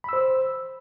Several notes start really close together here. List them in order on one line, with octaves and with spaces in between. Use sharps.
B5 E6 C5